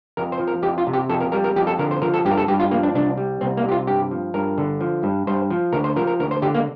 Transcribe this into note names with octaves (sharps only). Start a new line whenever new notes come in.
F2 A#4
C5
F3
A#4
F2 G4
F4
C3
G4
F2 A4
A#4
G3 A#4
A#4
F2 G4
A4
D3 A#4
C5
F3 A#4
A4
G2 G4
A#4
A4
G2 G4
F4
F3 A#3
D4
C2 D4
G3
C2 C4
A#3
C3 G4
F4
G2 G4
F3
G2 A#4
D3
F3
G2
G2 C5
F3
D2 A#4
C5
F3 A#4
A#4
D2 A#4
C5
D3 G4
A#3